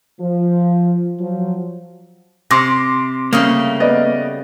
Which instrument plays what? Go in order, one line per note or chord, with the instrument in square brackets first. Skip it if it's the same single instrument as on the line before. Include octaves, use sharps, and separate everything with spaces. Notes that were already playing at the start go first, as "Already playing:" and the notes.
[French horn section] F3
F3 F#3
[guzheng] C3 [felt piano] C6 D6 A#6
[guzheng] C#3 G3 A3 [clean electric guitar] A#3 [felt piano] F5 D#6
[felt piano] B3 D5 D#5